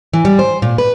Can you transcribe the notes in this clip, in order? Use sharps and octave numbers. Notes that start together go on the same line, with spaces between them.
E3
G3
C5
A#2
B4